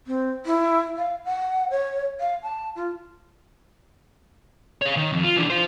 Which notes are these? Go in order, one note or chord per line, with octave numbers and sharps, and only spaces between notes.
C4
E4
F5
F#5
C#5
F5
A5
F4
C#5 F5
D#3
F2
F4
E3 D4
F4 C5